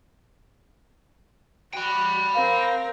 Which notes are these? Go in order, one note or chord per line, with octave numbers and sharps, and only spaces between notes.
F#4 G5 B5
C4 A#4 F5